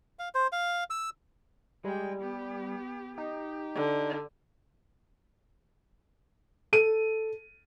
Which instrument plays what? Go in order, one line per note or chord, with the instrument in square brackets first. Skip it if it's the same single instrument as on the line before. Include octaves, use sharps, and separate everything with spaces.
[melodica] F5
C5
F5
E6
[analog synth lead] G3 [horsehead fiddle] G#3 G5
[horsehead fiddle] B3 G4
[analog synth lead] D#4 [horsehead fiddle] G4
[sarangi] D3
[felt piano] A4 D#7